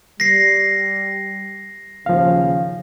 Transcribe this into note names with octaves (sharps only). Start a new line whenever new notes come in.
G3 A#6 C7
D#2 C#3 F3 F5